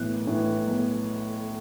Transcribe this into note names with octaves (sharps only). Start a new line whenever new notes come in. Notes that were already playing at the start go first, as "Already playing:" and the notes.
Already playing: B1 A2 E3 F#6
A2 E3
B1